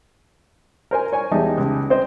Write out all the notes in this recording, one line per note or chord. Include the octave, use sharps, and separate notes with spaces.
A#4 C5 G#5
C#5 G#5
E2 G#3 D#4 G4 A5
C#2
C4 C5 D#5